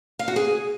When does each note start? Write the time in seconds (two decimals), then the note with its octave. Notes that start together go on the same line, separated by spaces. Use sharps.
0.19 F5
0.28 F#4
0.36 G#4